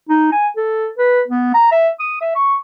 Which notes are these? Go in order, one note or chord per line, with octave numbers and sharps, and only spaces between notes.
D#4
G#5
A4
B4
B3
A#5
E5
D#6
E5
C#6